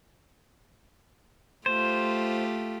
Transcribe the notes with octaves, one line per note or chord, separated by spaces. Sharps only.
A3 F4 G4 C5